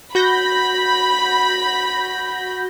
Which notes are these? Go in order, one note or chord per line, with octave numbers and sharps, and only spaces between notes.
F#4 B5 G6 A#6